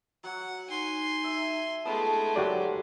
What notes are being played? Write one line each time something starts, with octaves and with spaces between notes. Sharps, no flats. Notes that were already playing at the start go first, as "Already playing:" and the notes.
F#3 F#5
D#4 G#5 C6
E5
G#3 A3 B3 D#4 F4 A5
F#3 F#4 G4 A4 A#4 D5